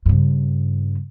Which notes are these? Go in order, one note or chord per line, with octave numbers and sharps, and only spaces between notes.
G2 C#3